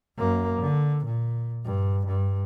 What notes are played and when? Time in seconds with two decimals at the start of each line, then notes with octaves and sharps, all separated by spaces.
0.17 F#2 A#3
0.61 D3
1.05 A#2
1.65 G2
2.06 G2